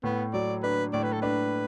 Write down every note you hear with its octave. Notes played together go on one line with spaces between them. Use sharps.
A2 B3
F#3 D5
D4 B4
A2 D5
B4
A4
D4 B4